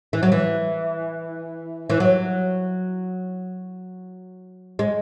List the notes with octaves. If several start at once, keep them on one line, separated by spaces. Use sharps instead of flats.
E3
F#3
E3
E3
F#3
G#3